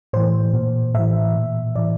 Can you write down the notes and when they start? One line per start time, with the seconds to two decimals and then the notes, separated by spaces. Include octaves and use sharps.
0.13 A2 E3 C5
0.53 A#2
0.94 A2 E3 E5
1.35 A#2
1.76 A2 E3 D5